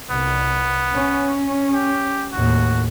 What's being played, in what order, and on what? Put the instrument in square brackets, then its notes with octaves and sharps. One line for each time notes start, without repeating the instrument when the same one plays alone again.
[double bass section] C2 [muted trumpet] B3
[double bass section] C#4
[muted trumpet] G4
[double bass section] D#2 A2 [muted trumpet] F#4